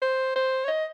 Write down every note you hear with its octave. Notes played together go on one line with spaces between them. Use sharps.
C5
C5
C#5
D#5